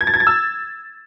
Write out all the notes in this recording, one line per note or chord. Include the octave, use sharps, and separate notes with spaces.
G#6
A6
G#6
A6
E6